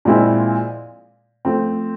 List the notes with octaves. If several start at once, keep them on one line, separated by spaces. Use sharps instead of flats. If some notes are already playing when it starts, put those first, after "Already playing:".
A#2 F3 G#3 C4 E4
F3 A3 C4